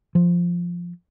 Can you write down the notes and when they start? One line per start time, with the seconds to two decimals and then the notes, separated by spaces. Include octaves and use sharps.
0.15 F3